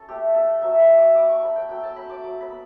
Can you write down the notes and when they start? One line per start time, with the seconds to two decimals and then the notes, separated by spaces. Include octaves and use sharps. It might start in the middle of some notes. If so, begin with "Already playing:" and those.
Already playing: C#4 A4
0.08 A3 G4
0.34 D4 A4
0.62 F#3 E5
0.80 B5
0.89 A3
0.98 D6
1.15 G3 D6
1.29 C#6
1.43 D4 B5
1.56 G5
1.69 F#3 G5
1.83 A5
1.96 C#4 B5
2.10 D6
2.23 F#3 D6
2.41 B5
2.50 B3